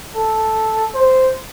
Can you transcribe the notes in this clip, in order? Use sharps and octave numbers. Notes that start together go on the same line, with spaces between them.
A4
C5